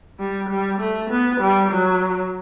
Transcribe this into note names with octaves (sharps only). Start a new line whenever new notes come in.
G3
G3
A3
B3
G3
F#3